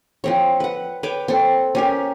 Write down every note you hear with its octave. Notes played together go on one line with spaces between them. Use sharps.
F3 C4 C#5
B4 F#5
B4 C#5 G5 D6
C4 A4
C#4 G4 A#4